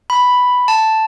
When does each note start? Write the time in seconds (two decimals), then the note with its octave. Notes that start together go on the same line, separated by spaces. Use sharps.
0.10 B5
0.68 A5